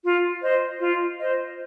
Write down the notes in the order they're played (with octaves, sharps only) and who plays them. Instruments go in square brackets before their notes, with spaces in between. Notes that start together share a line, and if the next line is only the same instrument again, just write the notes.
[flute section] F4
C5 D#5
F4
C5 D#5